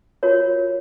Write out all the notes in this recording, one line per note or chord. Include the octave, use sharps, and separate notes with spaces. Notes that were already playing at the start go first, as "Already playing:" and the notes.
F4 F#4 A#4 C#5